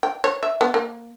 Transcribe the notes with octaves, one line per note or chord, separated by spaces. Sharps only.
G5
C#5
E5
B3
A#3